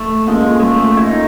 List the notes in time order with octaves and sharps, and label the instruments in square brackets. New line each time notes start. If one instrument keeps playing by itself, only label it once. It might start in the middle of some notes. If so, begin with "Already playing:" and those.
Already playing: [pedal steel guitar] A3
[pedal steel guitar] G#3 [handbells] A#3 C#4 F4 A4
[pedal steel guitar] G#3
A3
E4
D#4